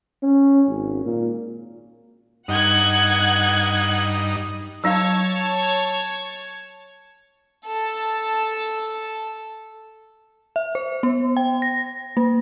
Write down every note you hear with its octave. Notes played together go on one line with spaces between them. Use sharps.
C#4
G#1
A#2
G2 D#4 F#5 F#6 G#6
F#3 D#4 C#5 F5 A5 G#6
A4 A5
E5
C5
B3
G5
A#6
A#3